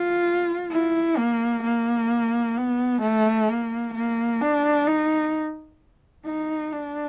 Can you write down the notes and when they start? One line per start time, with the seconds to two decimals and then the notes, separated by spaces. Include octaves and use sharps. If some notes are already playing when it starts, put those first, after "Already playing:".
Already playing: F4
0.72 E4
1.17 A#3
1.64 A#3
2.57 B3
3.02 A3
3.49 A#3
3.95 A#3
4.41 D4
4.87 D#4
6.26 D#4
6.72 D4